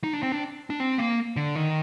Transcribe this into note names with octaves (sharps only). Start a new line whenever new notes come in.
D#4
D4
C4
D4
D4
C4
A#3
D3
D#3